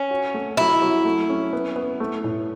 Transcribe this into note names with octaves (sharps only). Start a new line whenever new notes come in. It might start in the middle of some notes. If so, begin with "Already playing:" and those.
Already playing: C#4
F#4
A3
F#3 E4
F#3
A3
C#4
B3
B3
A3
A2